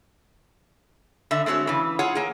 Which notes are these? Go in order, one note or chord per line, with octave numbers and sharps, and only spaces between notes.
D3 E5
G#3 A3 C4 F#4 C#5
C#3 E3
F4 G#4 C#5 F#5
A#3 G#4